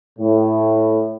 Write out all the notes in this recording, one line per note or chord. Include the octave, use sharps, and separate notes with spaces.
A2